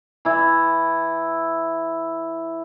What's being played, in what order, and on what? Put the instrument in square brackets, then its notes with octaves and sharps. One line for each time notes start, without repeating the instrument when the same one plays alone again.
[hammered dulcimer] E3 E4